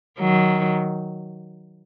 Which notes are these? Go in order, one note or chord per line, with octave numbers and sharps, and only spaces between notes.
D#3 F#3